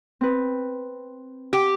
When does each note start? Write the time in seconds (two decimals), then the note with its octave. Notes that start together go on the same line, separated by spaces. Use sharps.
0.21 C4 B4
1.53 G4